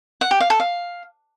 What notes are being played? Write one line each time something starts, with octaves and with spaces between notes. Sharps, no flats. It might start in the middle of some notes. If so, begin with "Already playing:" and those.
F#5
G4
F5
A4
F5